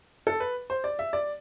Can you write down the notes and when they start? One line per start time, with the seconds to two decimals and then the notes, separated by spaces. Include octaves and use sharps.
0.27 A4
0.40 B4
0.70 C5
0.84 D5
0.99 E5
1.13 D5